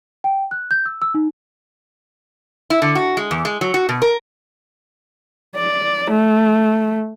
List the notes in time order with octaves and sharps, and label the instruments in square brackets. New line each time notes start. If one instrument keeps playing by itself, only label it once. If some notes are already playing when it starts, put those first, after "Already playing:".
[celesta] G5
F#6
G6
E6
E6
D#4
[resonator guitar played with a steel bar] E4
D3
F#4
G#3
E2
G#3
F#3
F#4
B2
A#4
[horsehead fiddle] D5
A3